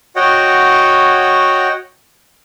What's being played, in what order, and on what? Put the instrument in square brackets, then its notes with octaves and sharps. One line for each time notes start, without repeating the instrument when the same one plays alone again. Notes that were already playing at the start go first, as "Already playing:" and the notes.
[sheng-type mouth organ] F#4 C#5 D#5 F#5 G5